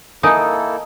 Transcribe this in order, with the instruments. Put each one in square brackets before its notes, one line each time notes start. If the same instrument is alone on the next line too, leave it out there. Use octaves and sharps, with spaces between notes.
[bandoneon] A#3 E4 A4 [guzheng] D#4 [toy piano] A#4 G#5 D#6